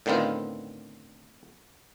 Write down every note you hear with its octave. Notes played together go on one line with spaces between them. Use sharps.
A2 D3 D#3 B3 C4 F4